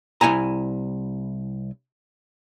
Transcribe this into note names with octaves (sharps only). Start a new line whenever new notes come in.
C2 E3 E4 G#5 A#5